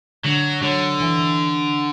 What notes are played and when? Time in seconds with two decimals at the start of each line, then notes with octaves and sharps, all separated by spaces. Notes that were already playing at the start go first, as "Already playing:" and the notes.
0.24 D3 F#3
0.62 D3 F#3
1.00 E3